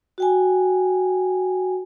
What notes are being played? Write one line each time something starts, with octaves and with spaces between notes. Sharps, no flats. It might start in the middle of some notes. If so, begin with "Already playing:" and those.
F#4 G5 G#5